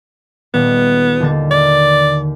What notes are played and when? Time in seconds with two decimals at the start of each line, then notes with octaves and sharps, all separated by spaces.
0.54 D#1 B3
1.20 D#2 D3 A6
1.51 A#4 D5